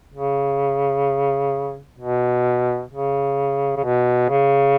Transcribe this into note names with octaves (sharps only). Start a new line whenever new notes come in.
C#3
B2
C#3
C#3
B2
C#3